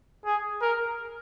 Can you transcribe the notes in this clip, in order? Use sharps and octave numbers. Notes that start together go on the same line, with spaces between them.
G#4
A#4